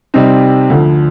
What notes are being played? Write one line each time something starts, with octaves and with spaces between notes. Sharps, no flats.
C3 G3 C4 D#4
D2 D3 F3